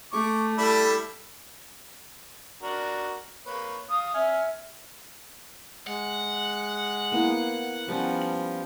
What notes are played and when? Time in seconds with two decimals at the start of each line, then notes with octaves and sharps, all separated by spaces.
0.12 A3 C#6 D6
0.58 G3 D4 E4 A4
2.62 D4 F#4 A#4
3.46 A#3 B4 C#5
3.90 F5 D#6
4.14 E5 G#5 F6
5.87 G#3 F#5
7.12 A#3 B3 E4
7.88 F3 G3 B3 C#4